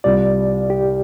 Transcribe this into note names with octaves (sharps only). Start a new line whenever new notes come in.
C2 C3 G3 F4 D5
G4